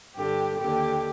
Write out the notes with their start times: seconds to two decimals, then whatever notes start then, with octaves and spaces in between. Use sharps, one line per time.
0.16 G2 D3 G4
0.60 D#2 D3 G4